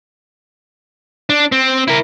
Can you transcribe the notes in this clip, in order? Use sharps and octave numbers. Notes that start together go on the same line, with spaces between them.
D4
C4
E4 A#4